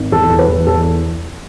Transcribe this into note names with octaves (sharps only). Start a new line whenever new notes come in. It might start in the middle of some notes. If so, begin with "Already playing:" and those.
Already playing: G#1
E2 A4
E2
B4
E2
E2 A4